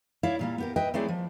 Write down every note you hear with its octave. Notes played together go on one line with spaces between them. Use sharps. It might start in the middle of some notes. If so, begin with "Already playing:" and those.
E4 C#5 D5 E5 F5
A#2 G3 A#3
B3 G4 A#4
B4 D#5 E5 G5
F#3 A3 C4 E4 G#4 D5
F3